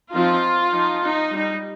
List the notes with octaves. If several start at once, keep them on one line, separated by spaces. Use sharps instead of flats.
F3 C4 D#4 F4
F3 D#4
D#4
G3 D#4